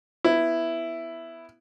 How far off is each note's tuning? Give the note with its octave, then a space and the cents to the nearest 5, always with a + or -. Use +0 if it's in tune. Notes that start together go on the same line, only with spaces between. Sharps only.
B3 +0 E4 +5